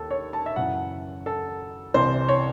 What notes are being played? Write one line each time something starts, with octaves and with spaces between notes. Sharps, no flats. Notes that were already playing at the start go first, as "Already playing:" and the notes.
Already playing: D#2 A4
C#5
A5
E5
F#2 C#3 E3 F#5
A4
C2 C3 E3 C5
C#5